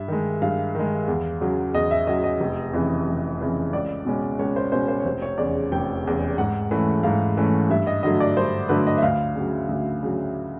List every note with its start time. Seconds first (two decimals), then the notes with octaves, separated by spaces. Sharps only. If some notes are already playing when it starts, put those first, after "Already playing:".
Already playing: G2 E5
0.08 D#3 G#3
0.42 G2 F5
0.75 D#3 G#3
1.08 E2
1.41 C#3 F#3
1.74 E2 D#5
1.91 E5
2.07 C#3 F#3 D#5
2.24 D#5
2.40 F1
2.73 F2 C#3 E3
3.07 F1
3.40 F2 C#3 E3
3.73 C#2 D5
4.05 B2 G#3 C#4
4.39 C#2 C#5
4.56 C5
4.72 B2 G#3 C#4 C5
4.88 C5
5.00 C#5
5.05 F1 C5
5.22 C#5
5.38 E2 C#3 D5
5.72 F1 G5
6.04 E2 C#3
6.38 G#2 F#5
6.71 E3 A3 C#4
7.03 G#2 F5
7.37 E3 A3 C#4
7.70 G2 E5
7.87 D#5
8.03 D3 F#3 A3 D#5
8.20 D5
8.37 G2 C5
8.69 D3 F#3 A3 B4
8.87 D#5
8.97 E5
9.02 D2 F5
9.35 C#3 F#3
9.69 D2
10.03 C#3 F#3